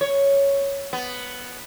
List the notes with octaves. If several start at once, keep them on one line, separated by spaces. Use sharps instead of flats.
C#5
B3